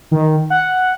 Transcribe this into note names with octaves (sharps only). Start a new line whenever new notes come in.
D#3
F#5